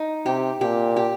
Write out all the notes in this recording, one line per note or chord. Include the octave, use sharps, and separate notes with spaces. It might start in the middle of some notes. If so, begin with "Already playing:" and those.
Already playing: D#4
C3 G4
A#2 G4
G4